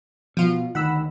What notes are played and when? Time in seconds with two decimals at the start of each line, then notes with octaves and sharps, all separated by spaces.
0.37 B2 F3 F4
0.75 D2 D#3 F#5 B5 E6